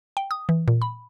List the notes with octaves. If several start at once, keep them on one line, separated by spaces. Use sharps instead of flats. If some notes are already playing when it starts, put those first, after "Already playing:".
G5
D#6
E3
A#2
B5